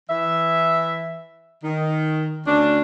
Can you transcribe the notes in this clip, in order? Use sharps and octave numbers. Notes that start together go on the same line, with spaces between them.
E3 E5
D#3
D2 C#4 D4